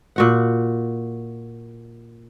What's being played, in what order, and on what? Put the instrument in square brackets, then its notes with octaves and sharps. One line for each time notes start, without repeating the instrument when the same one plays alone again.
[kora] A#2 F#4 F#5